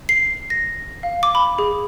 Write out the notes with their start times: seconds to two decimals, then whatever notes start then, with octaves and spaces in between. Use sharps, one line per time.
0.09 C7
0.50 A#6
1.03 F5
1.23 D6
1.35 B5
1.59 G#4